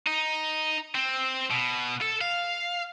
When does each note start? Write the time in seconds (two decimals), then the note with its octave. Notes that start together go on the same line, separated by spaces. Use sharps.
0.07 D#4
0.95 C4
1.50 B2
2.01 A4
2.21 F5